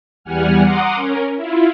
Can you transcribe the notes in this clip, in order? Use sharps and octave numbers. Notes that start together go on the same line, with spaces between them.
E2 G3 F#5 G#5 F6
F#5 A#5 C6 D6 D#6
C#4 A#4
E4 F4